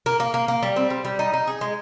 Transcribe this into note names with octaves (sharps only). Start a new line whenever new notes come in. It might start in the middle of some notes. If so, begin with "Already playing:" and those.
A#3
A#3
A#3
A#3
G3
C4
G3
G3
D#4
D#4
G#4
G#3